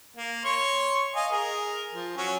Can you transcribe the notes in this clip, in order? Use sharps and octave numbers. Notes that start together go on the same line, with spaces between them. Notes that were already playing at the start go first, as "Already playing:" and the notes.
A#3
C#5 C6 C#6
D#5 F5 G#5
G#4 A#4
F3
F#3 C#4